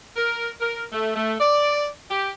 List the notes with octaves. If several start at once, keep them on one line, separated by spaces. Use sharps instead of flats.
A#4
A#4
A3
A3
D5
G4